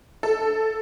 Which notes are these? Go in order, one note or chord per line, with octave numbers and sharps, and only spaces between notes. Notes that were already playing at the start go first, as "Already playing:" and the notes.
A4